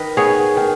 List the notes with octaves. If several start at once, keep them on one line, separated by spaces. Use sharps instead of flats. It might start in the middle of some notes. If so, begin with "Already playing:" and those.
Already playing: D#3 B4 D#5
B3 G#4 C#5
D#3